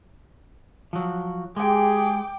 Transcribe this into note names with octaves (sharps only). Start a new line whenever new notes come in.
F3 F#3
G#3 G4 G#4 G5 D6